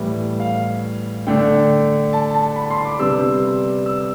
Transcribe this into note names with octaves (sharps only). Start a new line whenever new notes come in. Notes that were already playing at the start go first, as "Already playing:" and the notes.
Already playing: A2 E3 G3 B3 E5
F5
D3 A3 D4 G5
A5
A5
B5
C6
D6
C3 G3 B3 D4 E6
E6